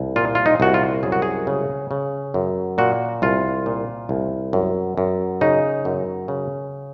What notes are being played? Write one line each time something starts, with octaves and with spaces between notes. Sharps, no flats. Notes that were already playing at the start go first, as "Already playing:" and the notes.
Already playing: C2
A#2 F4
F4
D#4
C2 F#4
F4
F#2 G#4
F#4
G#4
C#3
C#3
F#2
A#2 F#4
C2 F4
A#2
C2
F#2
F#2
C#3 D#4
F#2
C#3